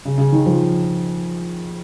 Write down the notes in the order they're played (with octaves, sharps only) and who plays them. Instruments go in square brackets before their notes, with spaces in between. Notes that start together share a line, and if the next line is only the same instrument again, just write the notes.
[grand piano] C#3
C#3
D#3
F3